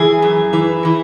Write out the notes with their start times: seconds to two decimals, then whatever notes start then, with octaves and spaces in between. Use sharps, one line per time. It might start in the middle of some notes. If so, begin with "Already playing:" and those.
Already playing: E3 G#4
0.22 F#2
0.53 E3
0.85 E3